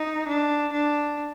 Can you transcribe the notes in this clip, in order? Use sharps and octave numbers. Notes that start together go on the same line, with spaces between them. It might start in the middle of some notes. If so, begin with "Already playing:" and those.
Already playing: D#4
D4
D4